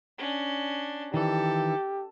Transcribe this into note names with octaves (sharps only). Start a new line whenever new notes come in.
C#4 D4
D#3 E3 G4 A4